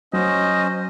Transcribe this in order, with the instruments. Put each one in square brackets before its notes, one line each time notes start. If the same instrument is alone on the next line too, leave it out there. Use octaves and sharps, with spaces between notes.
[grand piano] F#3 [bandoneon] C#4 C5 [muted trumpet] D#5